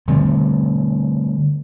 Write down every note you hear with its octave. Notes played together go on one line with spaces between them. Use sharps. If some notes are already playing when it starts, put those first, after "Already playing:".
D3 G3 A3 C4